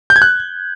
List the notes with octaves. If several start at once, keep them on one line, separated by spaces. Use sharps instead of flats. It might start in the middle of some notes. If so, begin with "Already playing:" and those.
G6
G#6
F#6